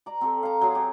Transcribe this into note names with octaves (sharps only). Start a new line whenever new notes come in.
D5 A#5
C4 G4 A4
F5 A#5
F#3 G#4 A#5 C6
G4 C#5